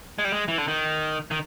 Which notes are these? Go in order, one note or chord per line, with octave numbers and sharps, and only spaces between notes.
G#3
G3
G#3
E3
D3
D#3
D#3